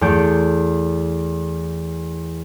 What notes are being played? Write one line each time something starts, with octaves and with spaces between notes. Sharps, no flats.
E2 A3 D6 G6